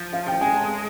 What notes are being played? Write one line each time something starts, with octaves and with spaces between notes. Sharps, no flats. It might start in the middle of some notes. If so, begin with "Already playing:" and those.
Already playing: F3
F5
G5
G#3 G#5
A5